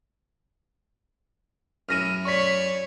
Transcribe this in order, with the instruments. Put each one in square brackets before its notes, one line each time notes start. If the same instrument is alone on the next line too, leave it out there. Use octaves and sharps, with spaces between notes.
[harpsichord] F#2 C#4 E4 [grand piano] F6 A#6 D#7
[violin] C#5 D5 [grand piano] C#6 B6